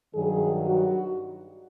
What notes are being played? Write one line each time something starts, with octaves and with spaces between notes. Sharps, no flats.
G2 D#3 F#3 G#4
F#4